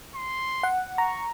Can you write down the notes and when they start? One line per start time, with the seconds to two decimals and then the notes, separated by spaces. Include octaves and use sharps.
0.15 C6
0.63 F#5
0.98 A#5 C#6